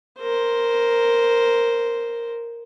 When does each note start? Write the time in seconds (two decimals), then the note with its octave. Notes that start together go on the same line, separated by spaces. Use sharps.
0.19 A#4 C5